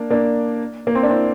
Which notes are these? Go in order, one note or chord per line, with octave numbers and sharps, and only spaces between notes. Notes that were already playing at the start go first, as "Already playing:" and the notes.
Already playing: A#3 D4
A#3 D4
A#3
C4
D4
C4 E4